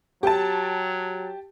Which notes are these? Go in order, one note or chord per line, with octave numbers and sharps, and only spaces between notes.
F#3 G4 A5